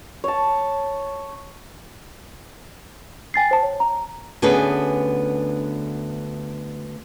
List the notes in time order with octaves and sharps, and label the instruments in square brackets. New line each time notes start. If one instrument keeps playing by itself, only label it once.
[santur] C#5 A5
[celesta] G5 G#5 A6 C7
C5 A5
C#5
A#5
[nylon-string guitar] D2 D3 B3 C#4 G#4 B4